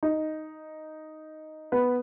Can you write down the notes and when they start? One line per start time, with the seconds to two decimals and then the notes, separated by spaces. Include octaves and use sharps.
0.03 D#4
1.72 B3 B4